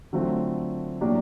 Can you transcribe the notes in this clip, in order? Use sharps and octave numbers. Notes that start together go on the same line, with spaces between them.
D3 F#3 A3 C4 F4
A2 F#3 A#3 D4 G4